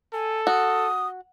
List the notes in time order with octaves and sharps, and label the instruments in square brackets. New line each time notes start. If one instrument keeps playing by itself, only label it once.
[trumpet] A4 [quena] G#5
[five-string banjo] F#4 [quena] D#6